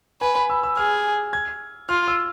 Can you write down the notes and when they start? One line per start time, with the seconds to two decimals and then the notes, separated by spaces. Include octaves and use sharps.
0.21 B4 G#5
0.36 B5
0.50 E6
0.63 E6
0.77 G#4 F6
1.33 G#6
1.89 F4 F6
2.08 E6